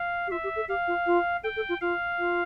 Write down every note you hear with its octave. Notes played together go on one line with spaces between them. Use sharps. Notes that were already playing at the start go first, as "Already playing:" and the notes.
Already playing: F5
G4
F4 E5
G4
A4
G4 F5
F4
F4
A4 G5
A4
F4
F4 F5
F4